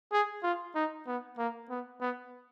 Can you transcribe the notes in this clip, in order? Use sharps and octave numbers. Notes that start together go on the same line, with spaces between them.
G#4
F4
D#4
B3
A#3
B3
B3